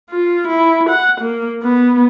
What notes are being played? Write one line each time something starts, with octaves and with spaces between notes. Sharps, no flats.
F4
E4
F#5
A#3
B3